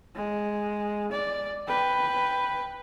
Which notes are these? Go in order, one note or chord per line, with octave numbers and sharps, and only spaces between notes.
G#3
D5
B4 G5